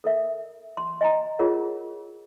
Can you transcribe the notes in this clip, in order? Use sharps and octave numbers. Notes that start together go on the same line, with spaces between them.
A4 A#4 E5
C6
D#5 G#5 A#5
F4 G#4 A#4 C#5 F#5